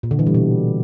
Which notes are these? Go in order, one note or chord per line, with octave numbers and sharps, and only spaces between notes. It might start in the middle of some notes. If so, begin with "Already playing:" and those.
A#2
D3
E3
G3
B2